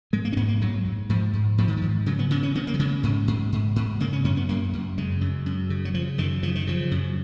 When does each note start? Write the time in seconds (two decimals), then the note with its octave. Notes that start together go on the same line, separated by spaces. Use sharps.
0.13 G#2 G#3
0.25 A#3
0.32 C#4
0.37 G#2 B3
0.48 A#3
0.61 G#2 F#3
0.85 G#2
1.09 G#2 F3
1.33 G#2
1.58 G#2 F3
1.68 D#3
1.77 F3
1.82 G#2
2.06 C#3 F#3
2.19 B3
2.31 C#3 B3
2.43 C#4
2.55 C#3 B3
2.67 A#3
2.74 F#3
2.80 C#3 G#3
3.03 G#2
3.28 G#2
3.52 G#2
3.76 G#2
4.00 C#3 A#3
4.13 C#4
4.24 F#2 C#4
4.37 B3
4.49 F#2 A#3
4.73 F#2
4.98 C#3 G#3
5.21 F#2
5.46 F#2
5.70 C#3
5.85 F#3
5.94 C#3 F3
6.18 F#2 D#3
6.42 C#3 F3
6.55 D#3
6.67 C#3 F3
6.91 F#2